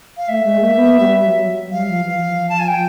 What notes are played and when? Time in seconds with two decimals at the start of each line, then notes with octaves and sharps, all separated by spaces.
0.17 F5
0.28 A3 E5
0.43 G#3
0.61 A#3
0.76 B3
1.00 G3
1.24 F#3
1.48 F#3
1.72 G3 F5
1.88 F3
2.04 E3
2.20 F3
2.49 A5
2.60 G#5
2.68 G5